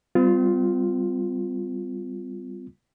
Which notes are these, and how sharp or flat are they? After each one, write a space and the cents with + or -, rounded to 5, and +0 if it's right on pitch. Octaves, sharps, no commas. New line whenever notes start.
G3 +0 C4 -40 F4 +0